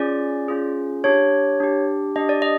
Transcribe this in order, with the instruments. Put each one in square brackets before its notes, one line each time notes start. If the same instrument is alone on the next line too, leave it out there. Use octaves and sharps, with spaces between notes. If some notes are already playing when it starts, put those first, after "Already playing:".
Already playing: [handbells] C#4 F4 G#4 D5
C#4 F4 G#4
D4 G4 C#5
D4 G4
D4 G4 D#5
D5
D#5